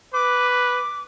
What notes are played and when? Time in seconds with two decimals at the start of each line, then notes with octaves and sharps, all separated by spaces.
0.14 B4 D6
0.51 D6